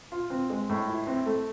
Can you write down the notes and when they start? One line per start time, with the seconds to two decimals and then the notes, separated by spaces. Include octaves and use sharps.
0.12 F4
0.30 C4
0.50 G#3
0.69 A2
0.89 E4
1.07 C4
1.26 A3